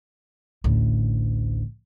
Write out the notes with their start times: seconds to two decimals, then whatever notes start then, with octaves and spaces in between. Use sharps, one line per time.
0.64 A1 D2